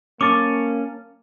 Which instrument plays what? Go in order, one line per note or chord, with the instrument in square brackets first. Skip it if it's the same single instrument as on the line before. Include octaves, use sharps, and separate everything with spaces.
[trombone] A#3 [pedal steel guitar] C#4 A5 [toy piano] D6